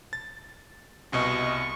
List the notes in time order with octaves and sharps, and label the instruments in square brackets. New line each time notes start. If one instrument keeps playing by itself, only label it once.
[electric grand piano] A6
[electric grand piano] C2 B2 D#5 [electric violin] C#6